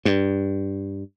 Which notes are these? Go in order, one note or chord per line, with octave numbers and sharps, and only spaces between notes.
G2